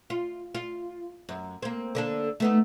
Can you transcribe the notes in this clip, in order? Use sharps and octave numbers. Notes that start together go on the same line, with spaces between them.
F4
F4
F#2
A#3 C4
D3 A#3 D4
A3 B3 D#4